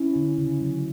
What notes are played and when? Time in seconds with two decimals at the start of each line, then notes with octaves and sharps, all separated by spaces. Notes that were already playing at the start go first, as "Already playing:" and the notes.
Already playing: C#4 E4
0.16 D3
0.38 C#3
0.61 F#3